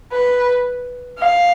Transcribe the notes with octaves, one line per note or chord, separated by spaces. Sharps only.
B4
F5